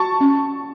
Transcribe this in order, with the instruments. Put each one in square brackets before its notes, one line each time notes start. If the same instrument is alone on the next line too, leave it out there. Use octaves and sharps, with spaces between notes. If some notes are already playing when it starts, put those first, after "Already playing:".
Already playing: [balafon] F#4 [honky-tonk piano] A5 C#6
[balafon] C#4